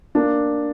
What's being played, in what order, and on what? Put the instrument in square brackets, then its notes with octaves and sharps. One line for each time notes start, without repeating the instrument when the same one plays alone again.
[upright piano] A#3 D4